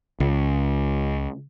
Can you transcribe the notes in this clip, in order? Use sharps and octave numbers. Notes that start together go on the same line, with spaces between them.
C#2